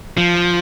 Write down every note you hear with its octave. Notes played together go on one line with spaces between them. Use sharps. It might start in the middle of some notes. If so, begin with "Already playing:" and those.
F3